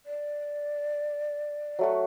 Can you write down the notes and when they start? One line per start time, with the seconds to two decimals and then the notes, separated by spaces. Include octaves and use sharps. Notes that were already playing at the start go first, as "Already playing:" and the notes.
0.06 D5
1.79 F#3 A3 F#4